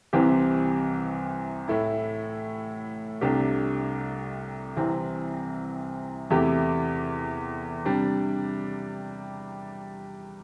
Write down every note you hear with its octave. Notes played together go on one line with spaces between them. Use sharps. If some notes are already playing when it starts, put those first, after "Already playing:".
C2 C3 E3 C4 G4
A2 A3 E4
C2 C3 A3 D4 G4
C2 C3 E3 C4
E2 C3 A3 E4 G4
C3 G3 D4